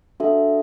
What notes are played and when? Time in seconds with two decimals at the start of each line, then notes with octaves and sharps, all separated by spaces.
0.20 D4 F#4 A4 E5